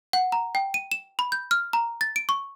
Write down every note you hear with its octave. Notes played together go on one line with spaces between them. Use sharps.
F#5
A#5
G5
D#7
E7
B5
G6
F6
A#5
A6
D7
C#6